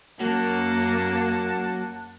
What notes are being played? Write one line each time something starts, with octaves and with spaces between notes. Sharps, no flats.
F#2 F#3 A#3 F#5 A5